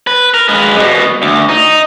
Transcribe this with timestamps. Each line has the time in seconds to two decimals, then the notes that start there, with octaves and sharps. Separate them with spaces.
0.07 B4
0.34 A#4
0.49 G#3 B4
0.75 C2 B2
1.22 D2
1.49 D#4